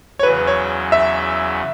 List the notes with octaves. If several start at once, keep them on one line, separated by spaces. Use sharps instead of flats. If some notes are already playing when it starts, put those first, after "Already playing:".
C#5
E2 C#3 F#3 B4
C#5
E5